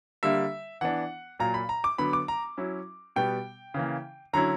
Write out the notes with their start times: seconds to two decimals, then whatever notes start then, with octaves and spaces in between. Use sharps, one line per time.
0.23 D3 G3 A#3 E5
0.81 E3 B3 D4 F#5
1.39 A#2 F#3 A#3 A#5
1.54 B5
1.69 A#5
1.84 D6
1.98 D3 F#3 B3 B5
2.13 D6
2.28 A#5
2.57 F#3 C#4 E4
3.16 B2 G3 B3 G5
3.74 C#3 E3 A#3
4.33 D3 F#3 C#4 E4 A#5